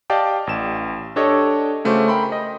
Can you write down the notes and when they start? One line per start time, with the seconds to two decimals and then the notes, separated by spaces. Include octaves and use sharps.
0.10 G4 D5 D#5 F5 G5 A5
0.47 A1 E7
1.16 D4 G4 A4 C#5 D#5
1.85 C#3 A3 F#4 C5 D6
2.08 A#4 G5 B5 C6
2.32 D#5